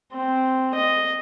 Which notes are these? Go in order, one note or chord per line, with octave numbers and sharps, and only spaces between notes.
C4
D#5